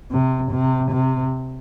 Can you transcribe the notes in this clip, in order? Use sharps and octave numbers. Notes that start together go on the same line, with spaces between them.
C3
C3
C3